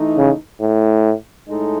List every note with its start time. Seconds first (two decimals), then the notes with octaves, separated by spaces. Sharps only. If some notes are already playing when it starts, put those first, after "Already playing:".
Already playing: E3 A3 D#4
0.17 C#3
0.61 A2
1.48 A2 G#3 D#4 A4